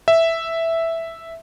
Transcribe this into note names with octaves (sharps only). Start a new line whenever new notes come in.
E5